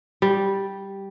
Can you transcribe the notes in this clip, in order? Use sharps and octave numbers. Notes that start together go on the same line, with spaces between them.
G3